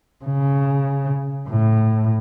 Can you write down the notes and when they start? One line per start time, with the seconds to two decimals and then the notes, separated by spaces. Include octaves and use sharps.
0.25 C#3
1.49 A2